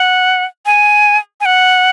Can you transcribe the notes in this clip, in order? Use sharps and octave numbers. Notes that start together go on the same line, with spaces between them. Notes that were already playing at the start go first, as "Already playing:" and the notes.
Already playing: F#5
G#5
G#5
F#5